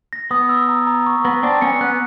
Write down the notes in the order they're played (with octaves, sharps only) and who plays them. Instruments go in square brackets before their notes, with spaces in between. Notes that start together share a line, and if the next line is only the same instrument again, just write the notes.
[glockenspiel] A#6
[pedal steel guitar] B3 [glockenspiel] D#6
[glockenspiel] E6
A#5
A#5
C#6
[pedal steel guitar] B3 [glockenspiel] A#6
[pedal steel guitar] C4 D4 [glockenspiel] D6
[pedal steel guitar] B3 C#4 [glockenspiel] C#7
[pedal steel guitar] B3 [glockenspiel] F#6